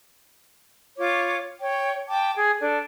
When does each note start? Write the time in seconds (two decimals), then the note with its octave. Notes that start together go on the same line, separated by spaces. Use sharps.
0.98 F4 C#5 D6
1.59 C#5 G5
2.08 G5 A5 D6
2.36 G#4
2.60 D4 A4